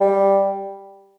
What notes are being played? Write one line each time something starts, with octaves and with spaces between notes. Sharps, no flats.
G3